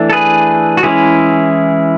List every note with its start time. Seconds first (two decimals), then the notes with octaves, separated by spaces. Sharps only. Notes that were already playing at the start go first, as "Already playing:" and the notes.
Already playing: E3 A3 D4
0.10 A4
0.13 G#4 B4
0.77 F#4
0.83 E3 G#3 C#4 E4 G#4